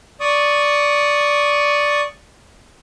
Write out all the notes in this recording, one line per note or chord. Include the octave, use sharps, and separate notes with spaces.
D5 C#6 D#6